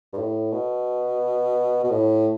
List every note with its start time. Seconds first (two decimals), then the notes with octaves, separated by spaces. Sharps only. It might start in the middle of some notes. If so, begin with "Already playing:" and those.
0.13 G2
0.18 A2
0.52 B2
1.84 B2
1.90 A2